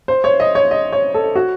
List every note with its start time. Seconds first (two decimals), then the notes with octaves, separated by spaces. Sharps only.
0.08 C5
0.24 C#5
0.40 D#5
0.55 C#5
0.71 D#5
0.93 C#5
1.14 A4
1.35 F#4